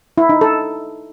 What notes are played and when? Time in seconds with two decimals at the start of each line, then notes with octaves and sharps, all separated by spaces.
0.18 E4
0.29 D#4
0.41 A4